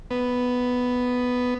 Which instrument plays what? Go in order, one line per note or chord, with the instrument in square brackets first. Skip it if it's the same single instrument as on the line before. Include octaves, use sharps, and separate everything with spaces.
[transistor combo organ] B3